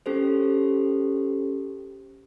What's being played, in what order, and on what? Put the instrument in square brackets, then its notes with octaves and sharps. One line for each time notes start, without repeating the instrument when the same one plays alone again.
[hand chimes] C#4 G4 A4 C5